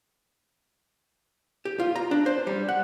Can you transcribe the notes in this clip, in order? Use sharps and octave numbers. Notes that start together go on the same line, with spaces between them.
G4
F4
A#5
D4
C5
G3
F#5